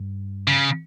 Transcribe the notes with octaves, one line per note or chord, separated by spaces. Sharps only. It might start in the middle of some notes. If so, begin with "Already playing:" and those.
Already playing: G2
C#3